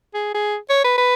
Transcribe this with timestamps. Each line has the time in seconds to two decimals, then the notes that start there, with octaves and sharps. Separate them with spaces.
0.14 G#4
0.34 G#4
0.69 C#5
0.84 B4
0.98 B4